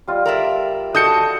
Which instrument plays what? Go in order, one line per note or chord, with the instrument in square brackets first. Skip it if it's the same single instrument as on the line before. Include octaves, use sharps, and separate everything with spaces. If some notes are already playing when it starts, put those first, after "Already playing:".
[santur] G3 F4 D#5
[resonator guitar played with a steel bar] A#4 D5 E5
[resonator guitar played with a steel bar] F#4 A4 D#5 [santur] A5 B5 [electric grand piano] D#6 G6 C#7